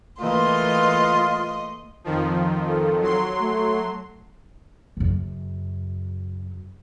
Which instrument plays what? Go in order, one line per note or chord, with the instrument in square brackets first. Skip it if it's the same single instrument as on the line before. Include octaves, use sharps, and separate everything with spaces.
[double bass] E3 A#3 [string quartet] A3 D#5 C6 [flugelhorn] F4
[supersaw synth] F2 D#3 F3
[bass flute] A4
[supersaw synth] F#3 C6
[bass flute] A3
[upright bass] F#2 C#3